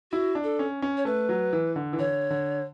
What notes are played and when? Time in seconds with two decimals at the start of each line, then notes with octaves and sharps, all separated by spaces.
0.11 E4 F#4
0.35 D4
0.44 A4
0.59 C#4
0.82 C#4
0.97 C#5
1.05 A3 B4
1.29 F#3
1.53 E3
1.76 D3
1.93 E3
1.99 D3 C#5
2.30 D3